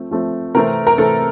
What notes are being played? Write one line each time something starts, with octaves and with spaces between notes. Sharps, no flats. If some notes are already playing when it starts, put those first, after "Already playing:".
Already playing: F3 A3 C4
F3 A3 C4
C3 E3 A3 C4 A#4
A#4
C3 E3 A3 C4 A4